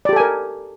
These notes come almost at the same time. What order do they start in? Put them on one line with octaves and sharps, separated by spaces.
D5 G4 A4 G#5 A#4